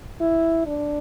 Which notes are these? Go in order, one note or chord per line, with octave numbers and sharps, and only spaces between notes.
E4
D4